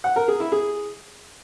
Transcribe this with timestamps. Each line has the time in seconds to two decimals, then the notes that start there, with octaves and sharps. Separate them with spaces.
0.04 F#5
0.16 A#4
0.28 G#4
0.40 E4
0.52 G#4